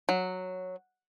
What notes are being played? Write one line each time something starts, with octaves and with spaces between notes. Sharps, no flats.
F#3